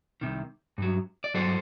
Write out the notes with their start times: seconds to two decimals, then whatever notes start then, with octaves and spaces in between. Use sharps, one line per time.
0.21 C2 C3 D#3
0.78 G2 F#3
1.24 D5
1.34 G2 F#3 A4 C5